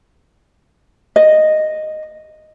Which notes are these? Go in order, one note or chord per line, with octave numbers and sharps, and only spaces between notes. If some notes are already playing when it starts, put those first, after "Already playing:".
D#5